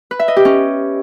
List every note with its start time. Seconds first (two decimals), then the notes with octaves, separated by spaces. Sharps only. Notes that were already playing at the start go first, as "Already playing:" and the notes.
0.11 B4
0.19 E5
0.28 D#5
0.36 G4
0.45 C#4